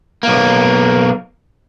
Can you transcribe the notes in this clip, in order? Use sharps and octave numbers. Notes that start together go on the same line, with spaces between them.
B1 A#3